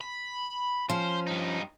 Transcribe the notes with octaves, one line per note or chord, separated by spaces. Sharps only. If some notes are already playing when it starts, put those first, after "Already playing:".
B5
F3 C#4 C5
G2 D#4